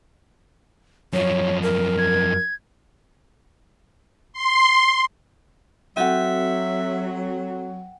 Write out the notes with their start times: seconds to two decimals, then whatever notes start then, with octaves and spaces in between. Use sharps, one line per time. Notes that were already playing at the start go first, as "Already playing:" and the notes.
1.13 F#2 F3 C#5
1.62 A#4
1.98 G#6
4.33 C6
5.97 F#3 C4 F#4 A4 E5 F#5 G5